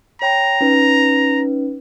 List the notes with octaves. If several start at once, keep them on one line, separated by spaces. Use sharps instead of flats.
C#5 G5 A#5 B5
C#4 D#4 B4